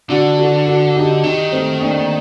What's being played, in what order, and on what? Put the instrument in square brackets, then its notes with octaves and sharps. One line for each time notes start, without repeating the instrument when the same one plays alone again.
[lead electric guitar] D3 [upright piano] D4 F#4
[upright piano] F#4 A4
F#4 A4
D#4 G4
[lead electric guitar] D#3 [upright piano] D#4 G4
[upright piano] A3 C4
A#3 D4